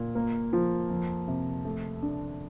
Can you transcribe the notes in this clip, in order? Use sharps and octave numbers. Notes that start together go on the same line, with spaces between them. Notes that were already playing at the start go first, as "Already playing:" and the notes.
Already playing: A#2
A#3
F3
F2
C3
A3
D4